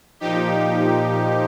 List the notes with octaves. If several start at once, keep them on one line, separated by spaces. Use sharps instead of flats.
A#2 F3 D#4 G4